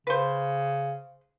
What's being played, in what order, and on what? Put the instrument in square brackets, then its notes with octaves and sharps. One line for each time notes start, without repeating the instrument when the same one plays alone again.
[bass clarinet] C#3 [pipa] B4 C5